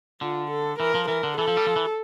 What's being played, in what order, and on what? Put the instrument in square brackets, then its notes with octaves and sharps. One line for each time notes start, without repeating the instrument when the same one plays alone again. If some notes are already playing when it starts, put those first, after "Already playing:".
[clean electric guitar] D3 [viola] F4
[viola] A4
[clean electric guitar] E3 [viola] A#4
[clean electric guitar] F3
[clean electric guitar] E3 [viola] A#4
[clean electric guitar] D3
[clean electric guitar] E3 [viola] A4
[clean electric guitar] F3
G3
F3
E3